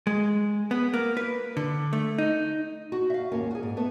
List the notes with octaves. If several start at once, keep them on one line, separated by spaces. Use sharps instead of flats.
G#3
B3
A#3
B4
D3
A3
D#4
F#4
E5 F5
D#2 G#2 A#3 C#4
F#4 G#4
G#2
A3 B3